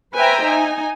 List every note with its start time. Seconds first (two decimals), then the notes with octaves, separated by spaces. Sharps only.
0.15 B4 C5 E5 G5 G#5 A#5
0.45 D#4 G#5